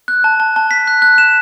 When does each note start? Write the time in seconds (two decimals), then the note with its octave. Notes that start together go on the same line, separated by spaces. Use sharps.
0.08 F#6
0.24 A5
0.40 A5
0.56 A5
0.71 B6
0.87 F#6
1.02 F#6
1.18 E7